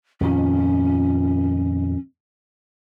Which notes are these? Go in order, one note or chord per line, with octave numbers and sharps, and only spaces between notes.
F2 A#2 D#3 C#4